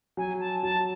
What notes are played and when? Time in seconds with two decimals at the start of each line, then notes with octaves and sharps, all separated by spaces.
0.17 F#3 G#5
0.40 A5
0.63 F#3 A5